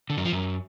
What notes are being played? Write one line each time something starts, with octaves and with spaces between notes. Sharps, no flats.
D3
F#2
F3
F#2